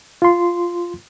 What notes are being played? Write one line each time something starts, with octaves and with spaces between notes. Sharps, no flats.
F4 C6